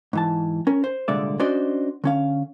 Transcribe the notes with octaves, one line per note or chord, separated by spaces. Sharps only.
G#2 E3 A5
C#4 A#4
C5
C2 A#2 D3 G#3 D5 E5
C#4 D4 F#4 C5 D5 D#5
D3 C#4 F5